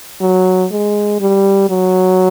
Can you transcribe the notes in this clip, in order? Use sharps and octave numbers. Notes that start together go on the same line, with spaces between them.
F#3
G#3
G3
F#3